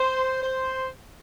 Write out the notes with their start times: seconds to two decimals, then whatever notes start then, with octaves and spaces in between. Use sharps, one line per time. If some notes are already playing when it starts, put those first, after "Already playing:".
Already playing: C5
0.42 C5